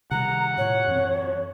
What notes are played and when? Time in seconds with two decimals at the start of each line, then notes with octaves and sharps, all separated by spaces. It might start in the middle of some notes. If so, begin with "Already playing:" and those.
0.11 C3 D#3 G3 F#5 A#5
0.58 A2 C3 C#5
0.88 F#2 E3 C4